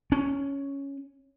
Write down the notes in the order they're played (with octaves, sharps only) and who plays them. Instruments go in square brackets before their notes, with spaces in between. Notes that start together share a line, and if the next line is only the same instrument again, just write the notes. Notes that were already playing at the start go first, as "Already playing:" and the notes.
[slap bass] C#4